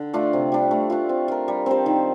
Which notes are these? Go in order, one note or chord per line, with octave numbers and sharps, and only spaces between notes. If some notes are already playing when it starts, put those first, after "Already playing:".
Already playing: D3
A3 D4 F4
C3
G3 D4
A3
D4 F4
C4
F4 A#4
G3
C4 G4 C5
D#3